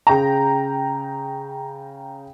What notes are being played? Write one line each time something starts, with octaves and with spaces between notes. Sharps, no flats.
C#3 G5 A#5